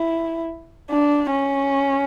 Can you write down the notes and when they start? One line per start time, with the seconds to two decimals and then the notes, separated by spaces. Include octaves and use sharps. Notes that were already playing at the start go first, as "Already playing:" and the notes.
Already playing: E4
0.90 D4
1.31 C#4